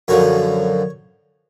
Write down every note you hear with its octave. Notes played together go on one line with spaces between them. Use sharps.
F#2 D3 F3 C#5